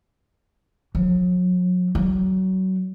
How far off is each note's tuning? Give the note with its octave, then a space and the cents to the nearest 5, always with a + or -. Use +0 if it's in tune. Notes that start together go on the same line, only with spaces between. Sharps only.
F#3 -40
F#3 +25